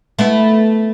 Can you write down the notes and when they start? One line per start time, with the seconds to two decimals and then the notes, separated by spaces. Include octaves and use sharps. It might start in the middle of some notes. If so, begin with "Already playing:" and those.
0.19 A3 B3 E4